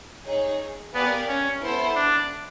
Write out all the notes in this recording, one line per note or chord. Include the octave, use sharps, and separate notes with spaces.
D#4 G#4 C#5
B3 G4 A#4 D5 F5 G#5
C#4
B3 E4 A4 C5
D4